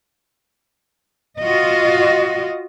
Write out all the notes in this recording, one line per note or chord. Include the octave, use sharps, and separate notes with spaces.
F4 F#4 D#5